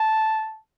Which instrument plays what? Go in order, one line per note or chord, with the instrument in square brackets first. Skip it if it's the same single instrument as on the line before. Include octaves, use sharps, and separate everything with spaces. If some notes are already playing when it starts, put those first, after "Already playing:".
Already playing: [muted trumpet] A5